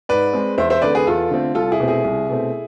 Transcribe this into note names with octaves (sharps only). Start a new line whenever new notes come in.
G#2 B4 D5
G#3 C4
E2 C5 E5
C5 E5
D3 A3 C4 B4 D5
G#4 B4
E2 F4 A4
D3 A3 C4
C2 F4 A4
E4 G#4
B2 A3 C4
E4 G#4
C2
B2 A3 C4